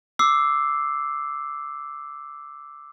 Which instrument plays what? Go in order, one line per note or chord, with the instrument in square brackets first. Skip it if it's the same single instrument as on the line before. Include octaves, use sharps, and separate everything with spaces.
[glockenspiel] D6 E6 C7